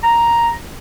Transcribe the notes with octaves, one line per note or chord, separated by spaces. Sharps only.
A#5